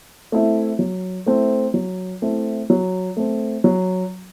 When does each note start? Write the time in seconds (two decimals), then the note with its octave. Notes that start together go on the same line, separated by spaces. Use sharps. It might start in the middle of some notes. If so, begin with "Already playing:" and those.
0.32 A3 C4 E4
0.79 F#3
1.26 A3 C4 E4
1.74 F#3
2.22 A3 C4 E4
2.70 F#3
3.17 A3 C4
3.64 F#3